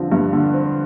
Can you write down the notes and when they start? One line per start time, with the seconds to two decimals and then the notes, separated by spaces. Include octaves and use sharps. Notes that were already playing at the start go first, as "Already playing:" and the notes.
Already playing: G2 D3 F3 C4
0.12 G2
0.33 D3
0.53 C4